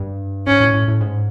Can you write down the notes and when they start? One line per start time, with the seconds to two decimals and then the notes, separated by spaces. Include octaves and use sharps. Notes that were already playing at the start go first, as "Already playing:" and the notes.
Already playing: G2
0.47 G#2 C#4
0.61 A2
0.73 A2
0.88 A2
1.01 G#2